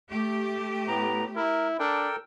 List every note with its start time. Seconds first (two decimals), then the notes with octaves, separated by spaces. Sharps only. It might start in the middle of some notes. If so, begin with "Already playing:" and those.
0.11 A3 G4
0.88 A2 B3 A#5
1.36 E4 A#4
1.79 D4 A4 A#4 G5